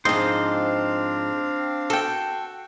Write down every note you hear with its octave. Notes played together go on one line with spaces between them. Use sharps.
G#2 F3 C4 D4 C5 D#5 F5
F#4 A4 G5